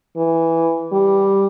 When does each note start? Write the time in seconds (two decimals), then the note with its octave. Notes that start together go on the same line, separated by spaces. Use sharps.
0.17 E3
0.92 G3